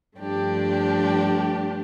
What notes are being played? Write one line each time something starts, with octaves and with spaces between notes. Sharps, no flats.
G2 F3 A3 D4 G4